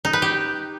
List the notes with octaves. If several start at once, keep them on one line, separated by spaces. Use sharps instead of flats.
D#4
B4
G4